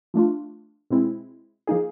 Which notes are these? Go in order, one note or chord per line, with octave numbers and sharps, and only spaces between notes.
F3 A3 D4 F4
B2 G#3 C4 E4
F3 A#3 D#4 G#4